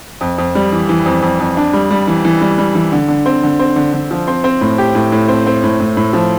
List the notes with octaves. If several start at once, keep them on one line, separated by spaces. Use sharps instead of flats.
F2
F2
G3
E3
E3
F2
F2
F2
D4
G3
G3
E3
E3
G3
G3
E3
D3
D3
C4
D3
C4
D3
D3
F3
C4
C4
A2
G4
A2
A2
C4
C4
A2
A2
A2
F3